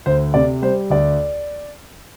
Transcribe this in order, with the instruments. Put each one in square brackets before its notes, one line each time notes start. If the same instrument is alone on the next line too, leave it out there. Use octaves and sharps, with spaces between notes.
[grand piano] D2 C5
C3 D5
G3 C5
D2 D5